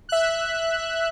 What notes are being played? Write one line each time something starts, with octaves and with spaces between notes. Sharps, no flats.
E5 F#6